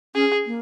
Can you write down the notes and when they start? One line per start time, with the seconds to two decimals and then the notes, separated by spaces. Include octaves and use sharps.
0.15 C#4 G#4
0.47 A#3